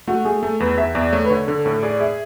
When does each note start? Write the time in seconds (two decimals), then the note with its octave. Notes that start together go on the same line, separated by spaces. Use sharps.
0.07 A3 F#4
0.25 A3 G#4
0.42 A3 A4
0.60 E2 B4
0.77 E2 E5
0.95 E2 D5
1.13 A3 C#5
1.25 B4
1.30 D3 C#5
1.47 D3 A4
1.65 A2 A4
1.83 G#4 D5
2.00 G#4 E5